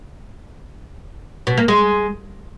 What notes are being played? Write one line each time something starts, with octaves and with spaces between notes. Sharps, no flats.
B2
A#3
G#3